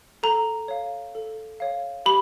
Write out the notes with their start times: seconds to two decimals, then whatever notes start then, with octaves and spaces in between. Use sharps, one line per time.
0.23 A4 A#5
0.68 C#5 F5
1.15 A4
1.60 C#5 F5
2.06 G4 B5